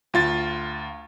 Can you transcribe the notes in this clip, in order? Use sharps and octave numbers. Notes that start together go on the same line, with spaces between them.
D2 F4 A6